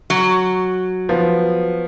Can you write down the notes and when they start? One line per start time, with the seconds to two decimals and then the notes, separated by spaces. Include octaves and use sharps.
0.10 F#3
1.09 F3 B3